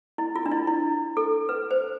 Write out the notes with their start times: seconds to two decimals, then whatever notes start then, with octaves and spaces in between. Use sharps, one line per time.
0.18 E4
0.36 F4
0.46 D4
0.51 E4
0.67 E4
1.17 A4
1.49 B4
1.71 C5